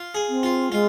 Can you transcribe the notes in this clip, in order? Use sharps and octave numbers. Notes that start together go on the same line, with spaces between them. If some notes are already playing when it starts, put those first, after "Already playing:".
Already playing: F4
G#4
C4
F4
G#3 F4